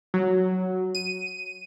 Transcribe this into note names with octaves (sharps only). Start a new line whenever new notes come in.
F#3
D#7